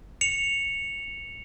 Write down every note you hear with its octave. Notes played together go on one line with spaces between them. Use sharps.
C#7 F7